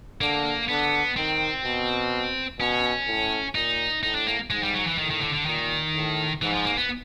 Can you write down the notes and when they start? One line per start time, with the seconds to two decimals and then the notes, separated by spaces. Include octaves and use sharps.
0.21 D3 A#3
0.68 D3 B3
1.16 D#3 C4
1.64 B2
2.59 B2 C#4
3.07 A2
3.55 A#2 D#4
4.03 A2 D#4
4.15 D4
4.27 A#3
4.50 G#2 G#3
4.63 G3
4.74 F#3
4.87 E3
4.98 A2 D#3
5.11 D#3
5.22 D3
5.34 D3
5.46 A#2 D#3
5.94 A2
6.42 G#2 E3
6.53 F3
6.65 A#3
6.77 B3